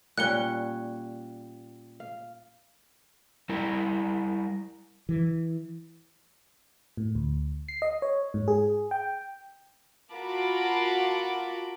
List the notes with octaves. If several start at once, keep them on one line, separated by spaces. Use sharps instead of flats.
A#2 G3 C#4 F#6 C#7 G7
F5
G3 E4 A#4
E3
A2
D2
C7
D#5
C#5
G#2
G#4
G5
F4 F#4 A#4 A5 B5 D6